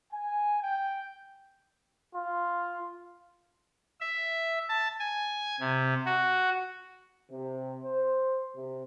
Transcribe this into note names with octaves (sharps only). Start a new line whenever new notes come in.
G#5
G5
F4
E5
A5
G#5
C3
F#4
C3
C5
C3